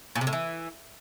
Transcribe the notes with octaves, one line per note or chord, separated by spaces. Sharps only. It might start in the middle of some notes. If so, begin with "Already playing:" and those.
A#2
C3
A2
E3